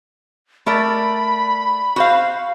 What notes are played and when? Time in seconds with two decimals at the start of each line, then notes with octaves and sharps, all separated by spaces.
0.66 A3 A#4 D5 B5
1.96 F#4 C5 F5